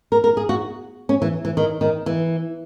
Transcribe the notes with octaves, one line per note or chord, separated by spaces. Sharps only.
A#4
A#4
G#4
F#4
C#4
E3
E3
D#3
D#3
E3